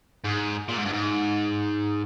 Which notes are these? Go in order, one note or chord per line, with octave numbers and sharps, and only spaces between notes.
G#2
A#2
G#2
G2
G#2